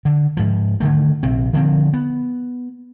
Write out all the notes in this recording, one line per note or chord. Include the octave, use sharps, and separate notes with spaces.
D3
G#2 F3
D3 D#3 A3
A#1 C3 C4
D3 D#3 F3 C4
B3